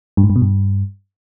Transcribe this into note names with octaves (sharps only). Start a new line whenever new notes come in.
G2
G#2
G2
B2
G2